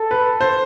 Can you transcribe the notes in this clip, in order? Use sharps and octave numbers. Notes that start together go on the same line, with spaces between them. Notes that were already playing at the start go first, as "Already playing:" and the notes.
Already playing: A4
B4
C5